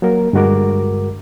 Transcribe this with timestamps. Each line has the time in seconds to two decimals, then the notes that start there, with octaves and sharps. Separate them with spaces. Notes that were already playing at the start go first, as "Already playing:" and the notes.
0.02 F#3 A#3 A#4
0.33 G2 D3 G#3 F#4 A#4 D6